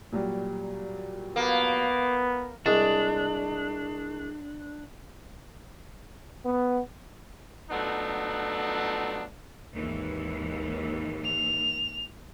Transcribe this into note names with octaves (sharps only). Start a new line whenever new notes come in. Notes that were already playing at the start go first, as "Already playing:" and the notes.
A#2 F#3 G3
A#3 B3
C2 G#3 D4
B3
F3 F#3 A3 B3 D4 D#4
G#1 D#2 E3
F7